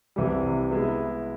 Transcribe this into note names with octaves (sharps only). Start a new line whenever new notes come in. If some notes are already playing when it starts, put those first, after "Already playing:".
C2 C3 E3 G3
G#3 B3 E4